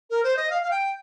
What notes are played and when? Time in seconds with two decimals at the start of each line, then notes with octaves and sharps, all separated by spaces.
0.10 A#4
0.23 C5
0.37 D#5
0.50 F5
0.63 F5
0.71 G5